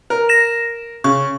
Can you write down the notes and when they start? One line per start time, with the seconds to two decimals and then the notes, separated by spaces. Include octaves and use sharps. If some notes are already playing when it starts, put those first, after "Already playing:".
0.10 A#4
0.29 A#6 E7
1.04 C#3 C#6